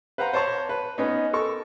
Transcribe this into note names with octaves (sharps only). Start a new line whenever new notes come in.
B4 C5 F5 F#5 A#5
C5 C#5 A5 A#5 C#6
B4
B3 C#4 D#4
A4 A#4 C#6